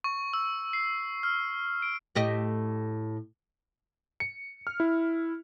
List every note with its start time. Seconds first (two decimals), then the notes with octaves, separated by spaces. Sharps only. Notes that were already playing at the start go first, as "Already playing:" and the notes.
0.04 C#6
0.33 E6
0.73 C7
1.23 F6
1.82 D7
2.15 A2 G4 D#5
4.20 C#7
4.67 F6
4.80 E4